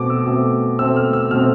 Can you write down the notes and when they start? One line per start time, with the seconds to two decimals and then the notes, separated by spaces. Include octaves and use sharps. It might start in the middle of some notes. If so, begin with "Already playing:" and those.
Already playing: B2 A3 C4 D6
0.10 E6
0.26 B2 A3 C4
0.79 B2 A3 C4 E6
0.96 F6
1.13 E6
1.31 B2 A3 C4 F6